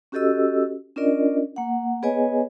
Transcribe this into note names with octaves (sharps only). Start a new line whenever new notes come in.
C#4 F#4 G4 A4 D#5 E6
C#4 D4 F4 A#4 D5 D#5
A#3 F#5
B3 G#4 B4 C#5 D#5 G#5